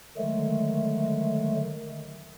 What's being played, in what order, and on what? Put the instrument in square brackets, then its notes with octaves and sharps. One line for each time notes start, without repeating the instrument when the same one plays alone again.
[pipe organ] D3 D#3 F#3 G#3 A3